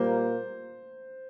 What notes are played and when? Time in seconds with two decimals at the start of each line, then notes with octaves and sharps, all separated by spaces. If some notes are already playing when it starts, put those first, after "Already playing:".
Already playing: A#2 G3 A#3 C5